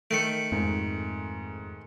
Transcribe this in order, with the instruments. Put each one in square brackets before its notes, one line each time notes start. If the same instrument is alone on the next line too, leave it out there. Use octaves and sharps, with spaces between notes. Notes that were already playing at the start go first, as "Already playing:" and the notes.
[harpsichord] D#3 A3 [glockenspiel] C#7 D7
[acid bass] F2 [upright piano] G#2